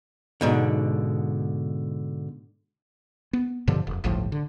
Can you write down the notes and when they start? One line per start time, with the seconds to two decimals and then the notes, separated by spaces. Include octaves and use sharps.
0.41 G#2 B2 D3
3.33 B3
3.68 G2 B2 D3 F3
3.87 F1
4.04 G1 C#2 A2 F3
4.32 D3